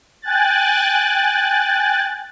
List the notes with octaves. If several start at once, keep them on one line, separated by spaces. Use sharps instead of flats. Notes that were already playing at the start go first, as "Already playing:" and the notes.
G5 G#5 F#6 A6